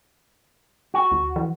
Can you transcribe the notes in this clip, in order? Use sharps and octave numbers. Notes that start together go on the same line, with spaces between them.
F#4
D2
E3